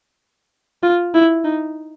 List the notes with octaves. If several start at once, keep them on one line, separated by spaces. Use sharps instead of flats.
F4
E4
D#4